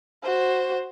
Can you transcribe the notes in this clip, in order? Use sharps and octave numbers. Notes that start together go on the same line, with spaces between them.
F#4 C5